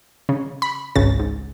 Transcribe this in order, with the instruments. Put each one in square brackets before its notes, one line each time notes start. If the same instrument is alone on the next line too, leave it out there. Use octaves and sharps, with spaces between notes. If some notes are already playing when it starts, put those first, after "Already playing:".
[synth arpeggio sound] C#3
B5
G#1 C#2 C#3 A6
G#2